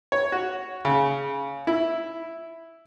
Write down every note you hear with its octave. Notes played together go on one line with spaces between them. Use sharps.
C#5
F#4
C#3
E4